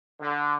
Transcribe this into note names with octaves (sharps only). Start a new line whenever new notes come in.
D3